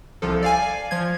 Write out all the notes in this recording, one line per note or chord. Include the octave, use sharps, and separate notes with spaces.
C2 F3 A4
D5 F5 G#5
F3 G#6